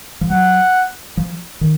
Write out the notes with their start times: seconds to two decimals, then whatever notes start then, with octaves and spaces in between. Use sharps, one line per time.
0.21 F3
0.30 F#3 F#5
1.17 F3
1.61 D#3